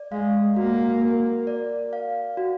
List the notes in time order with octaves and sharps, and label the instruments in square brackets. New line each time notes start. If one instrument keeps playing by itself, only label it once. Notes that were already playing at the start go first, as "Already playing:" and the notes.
Already playing: [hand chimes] D5
[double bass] G#3 [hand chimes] F5
[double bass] A#3 [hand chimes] F#4
[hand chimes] A#4
D5
F5
F#4